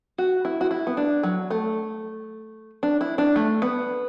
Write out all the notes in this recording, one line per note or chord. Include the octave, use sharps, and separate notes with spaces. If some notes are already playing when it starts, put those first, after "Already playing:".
F#4
E4
F#4
E4
B3
D4
F#3
A3
D4
E4
D4
A3
B3